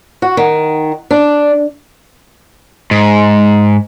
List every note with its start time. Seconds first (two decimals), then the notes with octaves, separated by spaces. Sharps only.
0.22 F#4
0.37 D#3
1.11 D4
2.91 G#2